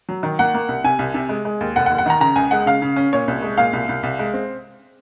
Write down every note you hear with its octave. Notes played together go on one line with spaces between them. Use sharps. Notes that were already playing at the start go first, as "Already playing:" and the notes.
F#3
D#3
A#3 F#5
A#3
C2
C3 G#5
C2
C3
G#3
G#3
D#2
F1 F#5
F#5
D#2
F#5
D#3 A#5
C#3 A#5
C#2 G#5
G#3 F#5
C#3 F5
C#3
C#4
A#2 C#5
C2
G#3
A#2 F5
C2
C2
C2
G#3
C4